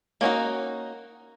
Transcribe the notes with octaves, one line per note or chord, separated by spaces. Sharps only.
A#3 C#4 D#4 F#4